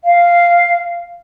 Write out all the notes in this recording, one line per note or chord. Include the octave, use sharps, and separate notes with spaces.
F5